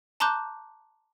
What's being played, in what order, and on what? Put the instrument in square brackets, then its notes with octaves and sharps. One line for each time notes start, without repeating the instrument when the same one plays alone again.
[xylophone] A5 A#5 C6 D6 F#6 G6